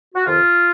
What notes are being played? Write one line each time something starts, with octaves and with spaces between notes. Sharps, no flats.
F#4
F2 C3 D#3 F4